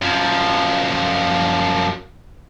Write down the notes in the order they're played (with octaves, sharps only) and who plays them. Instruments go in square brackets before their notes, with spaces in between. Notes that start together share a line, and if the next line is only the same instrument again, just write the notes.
[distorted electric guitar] F#2 F3